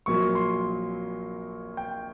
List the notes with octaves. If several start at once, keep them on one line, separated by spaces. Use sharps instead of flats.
A#1 A#2 F#3 A#3 C#6
C6
G5